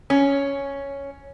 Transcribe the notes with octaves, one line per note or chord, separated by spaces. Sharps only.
C#4